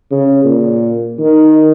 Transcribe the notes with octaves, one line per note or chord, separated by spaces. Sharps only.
C#3
A#2
D#3